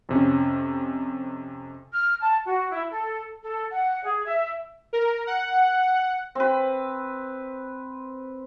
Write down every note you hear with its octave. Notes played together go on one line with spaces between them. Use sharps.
F2 C3 C#4
F6
A5
F#4
E4
A4
A4
F#5
G#4
E5
A#4
F#5
C4 B4